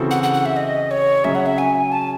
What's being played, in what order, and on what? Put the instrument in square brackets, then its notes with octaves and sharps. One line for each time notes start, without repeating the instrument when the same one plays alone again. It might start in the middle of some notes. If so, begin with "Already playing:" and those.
Already playing: [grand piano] C#3 E3 C4 F#4 A4
[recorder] F#5
F#5
F#5
E5
D#5
C#5
[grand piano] C#3 F#3 C#4 G#4 [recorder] E5
[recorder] F#5
E5
G#5
A5